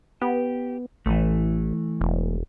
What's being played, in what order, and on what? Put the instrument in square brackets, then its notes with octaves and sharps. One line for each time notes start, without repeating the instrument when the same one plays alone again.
[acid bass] B3 [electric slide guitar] G4
[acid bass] A1 [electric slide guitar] E3 A3
[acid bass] E1